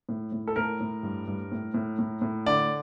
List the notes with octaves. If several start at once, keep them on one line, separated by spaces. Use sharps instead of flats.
A2
A2
A4
A2 A#4
A2
G2
G2
A2
A2
A2
A2
D3 D5